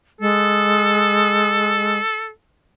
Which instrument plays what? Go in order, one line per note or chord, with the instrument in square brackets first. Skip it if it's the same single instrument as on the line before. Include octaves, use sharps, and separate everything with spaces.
[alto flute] G#3 [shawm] A4